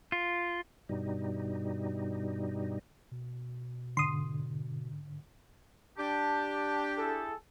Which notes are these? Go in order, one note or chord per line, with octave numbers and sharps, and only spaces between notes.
F4
G2 B2 G3 D#4
B2
G#2 D3 C6 D#6
D4 G4 A5
E4 G#4 A4